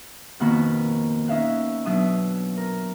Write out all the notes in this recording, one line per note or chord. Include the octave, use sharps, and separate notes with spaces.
F2 B2 D#3 A#3 F#4 B5
C#4 D#4 E5 F5 F#6
B2 F#3 D4 E5 D#6
A#4